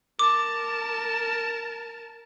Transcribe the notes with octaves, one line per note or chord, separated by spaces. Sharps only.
A#4 A5 D6